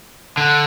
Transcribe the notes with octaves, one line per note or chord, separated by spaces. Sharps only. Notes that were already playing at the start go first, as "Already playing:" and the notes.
D3